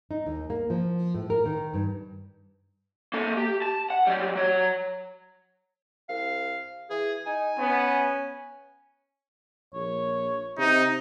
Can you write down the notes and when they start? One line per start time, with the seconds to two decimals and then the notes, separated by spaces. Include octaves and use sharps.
0.11 D#4
0.26 D#2
0.50 A#3
0.70 F3
1.14 A2
1.30 A#4
1.46 D#3
1.73 G2
3.14 A#3 A4
3.37 G4
3.62 A5
3.90 F#5
4.07 F#3 G3
4.35 F#3 C#5
6.09 C2 F5
6.90 E3 G#4
7.26 D#4 G#5
7.58 B3 C#4
9.74 A#1 C#5
10.58 C3 D#4